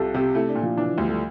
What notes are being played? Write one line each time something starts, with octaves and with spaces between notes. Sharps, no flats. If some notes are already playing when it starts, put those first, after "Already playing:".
Already playing: C2 F4 G4 A4
C3 G4
A3 E4
D4
A#2
F3
E3 D4
F3
D2 G3
A3